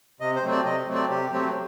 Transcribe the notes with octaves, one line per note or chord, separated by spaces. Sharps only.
C3 D#5
C5
F#3 A3 C4
D5
C3 D#5
F#3 A3 C4
D5
C3 G4
F#3 A3 C4 G4